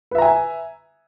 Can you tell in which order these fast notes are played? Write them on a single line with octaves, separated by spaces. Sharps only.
B4 E5 A#5 G#5